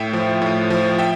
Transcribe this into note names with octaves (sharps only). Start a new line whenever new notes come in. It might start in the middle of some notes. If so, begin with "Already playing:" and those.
Already playing: A2 E5 G5
F3
A2
F3
E5 G5